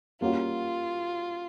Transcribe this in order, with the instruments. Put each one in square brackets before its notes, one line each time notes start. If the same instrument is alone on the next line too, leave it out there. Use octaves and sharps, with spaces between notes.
[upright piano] G3 A#3 C#4 F#4 [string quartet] F4